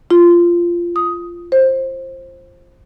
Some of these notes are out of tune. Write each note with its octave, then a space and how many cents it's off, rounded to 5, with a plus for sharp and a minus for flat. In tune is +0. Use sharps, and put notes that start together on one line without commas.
F4 -15
D#6 +10
C5 +20